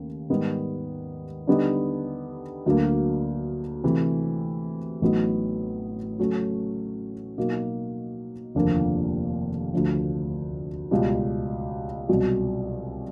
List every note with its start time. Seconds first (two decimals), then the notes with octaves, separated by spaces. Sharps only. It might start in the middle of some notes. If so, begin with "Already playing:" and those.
Already playing: D#2 C#3 A3
0.30 G#2 D#3 G3 B3
1.47 D3 G3 B3 D#4
2.66 D2 D3 F#3 A#3
3.84 C3 E3 A3
5.01 A1 A2 F#3 B3 D#4
6.19 C#3 F#3 A3 C#4
7.38 B2 F#3 A#3 D#4 F#4
8.55 F1 D#2 D3 F3 A#3
9.73 D2 D3 F3
10.91 C#2 B2 G3
12.09 C2 B2 F#3